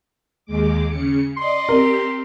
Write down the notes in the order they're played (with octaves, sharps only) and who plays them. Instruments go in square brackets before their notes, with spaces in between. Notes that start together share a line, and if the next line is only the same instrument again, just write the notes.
[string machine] D#2 G#3 D6
C#3 C#7
[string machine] D5 D#5 [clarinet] C6
[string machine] C4 G4 [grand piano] A#4